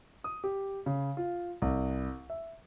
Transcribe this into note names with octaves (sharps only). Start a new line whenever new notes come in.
D#6
G4
C#3
F4
C2
E5